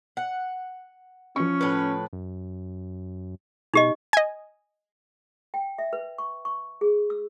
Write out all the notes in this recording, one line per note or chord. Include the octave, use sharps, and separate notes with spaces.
F#5
F3 C#4 C#6
A2 B4
F#2
B2 D#4 G4 D#5
D#5 G#5
G5
E5
B4
C#6
C#6
G#4
E6